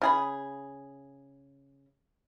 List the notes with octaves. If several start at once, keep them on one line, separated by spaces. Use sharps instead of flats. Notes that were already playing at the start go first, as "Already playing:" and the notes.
C#3 G#4 B5